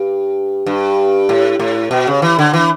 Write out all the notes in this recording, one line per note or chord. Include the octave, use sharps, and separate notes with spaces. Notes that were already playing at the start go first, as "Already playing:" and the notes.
Already playing: G2
G2
A2
A2
B2
C#3
E3
D3
E3